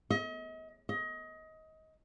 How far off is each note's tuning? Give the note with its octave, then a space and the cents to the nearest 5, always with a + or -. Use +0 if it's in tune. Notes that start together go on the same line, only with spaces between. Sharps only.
D#5 +40
D#5 +25